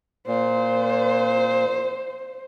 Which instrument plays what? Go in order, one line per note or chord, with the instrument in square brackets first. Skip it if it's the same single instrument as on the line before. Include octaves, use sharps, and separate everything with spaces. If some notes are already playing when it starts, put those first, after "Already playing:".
[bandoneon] A#2 [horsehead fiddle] C5